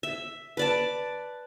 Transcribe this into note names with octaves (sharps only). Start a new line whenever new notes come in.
E5
B4 D5 A5